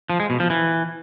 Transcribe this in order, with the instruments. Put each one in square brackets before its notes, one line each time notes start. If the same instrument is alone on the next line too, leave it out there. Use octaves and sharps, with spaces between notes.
[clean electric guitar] F3
G#3
B2
F3
E3